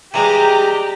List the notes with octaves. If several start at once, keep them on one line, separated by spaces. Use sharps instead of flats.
E3 G3 G#3 G4 A#5